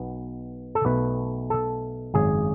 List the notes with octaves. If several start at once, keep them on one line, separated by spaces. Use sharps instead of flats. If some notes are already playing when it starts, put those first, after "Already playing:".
Already playing: B1 B2 B3
A4
B1 B2 A3 B4
A4
G#1 F#2 C#3 G#4